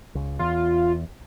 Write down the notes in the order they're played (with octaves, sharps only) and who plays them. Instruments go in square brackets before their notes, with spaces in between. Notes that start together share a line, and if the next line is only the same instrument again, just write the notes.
[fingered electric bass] C#2
[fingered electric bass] E2 [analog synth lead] F4